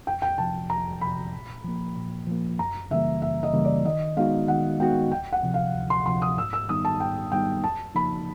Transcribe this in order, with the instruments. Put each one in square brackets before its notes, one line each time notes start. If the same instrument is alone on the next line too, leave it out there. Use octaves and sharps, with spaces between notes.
[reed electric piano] F2 [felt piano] G5
[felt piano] G5
[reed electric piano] C3 F3 [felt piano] A5
[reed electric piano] F2 [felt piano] A#5
[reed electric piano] C3 F3 [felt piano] B5
[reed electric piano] A#2
F3 A#3
A#2
F3 A#3
[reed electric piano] F#2 [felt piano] A#5
[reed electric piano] C#3 E3 G3 A#3 [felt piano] E5
[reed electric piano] F#2 [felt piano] E5
[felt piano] D#5
[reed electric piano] C#3 E3 G3 A#3
[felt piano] D5
[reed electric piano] D#3 [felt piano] D#5
[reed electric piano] G#3 B3 D#4 F#4 [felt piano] F5
[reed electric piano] D#3 [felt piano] F#5
[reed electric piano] G#3 B3 D#4 F#4 [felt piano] G5
[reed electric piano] D2 [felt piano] G5
[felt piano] F#5
[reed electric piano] C3 F3
[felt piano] F5
[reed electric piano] D2
[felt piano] C6
[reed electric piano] C3 F3 [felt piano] C6
[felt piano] D#6
[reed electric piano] G#2 [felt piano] E6
[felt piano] E6
[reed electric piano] D#3 G3 B3 D#4 [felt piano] D#6
[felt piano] A5
[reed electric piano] G#2 [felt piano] G5
[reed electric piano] D#3 G3 B3 D#4 [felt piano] G5
[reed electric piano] F2 [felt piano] A5
[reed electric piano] C#3 F3 A#3 D#4 [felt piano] B5